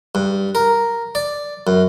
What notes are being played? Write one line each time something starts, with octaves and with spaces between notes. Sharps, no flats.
G2
A#4
D5
F#2